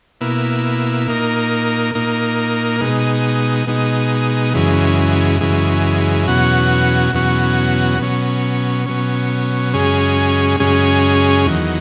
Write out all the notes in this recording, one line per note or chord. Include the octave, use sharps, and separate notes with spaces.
B2 A#3 E4
A#2 A#3 D#4 A#4
A#2 A#3 D#4 A#4
B2 G#3 D#4
B2 G#3 D#4
F#2 C#3 E3 G#3
F#2 C#3 E3 G#3
E2 B2 F#3 C#4 F#4
E2 B2 F#3 C#4 F#4
B2 F#3 C#4
B2 F#3 C#4
F#2 C#3 G#3 C#4 G#4
F#2 C#3 G#3 C#4 G#4
E2 D#3 F#3